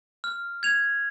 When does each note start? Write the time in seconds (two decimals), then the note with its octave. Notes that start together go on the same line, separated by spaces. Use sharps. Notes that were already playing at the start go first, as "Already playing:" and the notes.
0.24 F6
0.63 G#6 F7